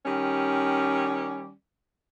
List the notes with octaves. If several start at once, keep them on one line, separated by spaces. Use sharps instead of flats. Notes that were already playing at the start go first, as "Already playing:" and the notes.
D#3 G3 C#4